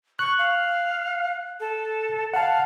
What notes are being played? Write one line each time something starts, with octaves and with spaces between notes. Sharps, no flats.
C#6 F#6
F5
A4
F5 F#5 A5